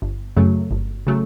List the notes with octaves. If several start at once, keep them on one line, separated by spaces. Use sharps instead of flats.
G1
F#2 C#3 F#3 A3
G1
C#3 F#3 A3